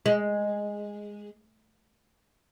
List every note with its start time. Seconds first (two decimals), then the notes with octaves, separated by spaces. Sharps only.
0.06 G#3